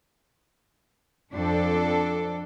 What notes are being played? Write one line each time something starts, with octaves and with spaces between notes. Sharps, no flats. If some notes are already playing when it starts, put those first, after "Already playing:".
F2 D4 A4